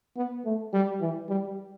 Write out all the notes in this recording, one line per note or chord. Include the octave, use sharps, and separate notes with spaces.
B3
A3
G3
E3
G3